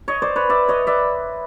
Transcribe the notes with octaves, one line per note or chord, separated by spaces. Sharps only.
C#5 D#5
C5 D5
B4 C#5
D5 E5
C#5 D#5
D5 E5